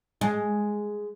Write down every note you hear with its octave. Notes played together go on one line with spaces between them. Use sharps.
G#3